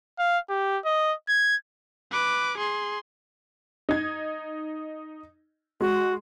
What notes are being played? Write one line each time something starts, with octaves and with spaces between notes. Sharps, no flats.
F5
G4
D#5
G#6
B4 D6
G#4 C6
D#4 G#6
G#3 F#4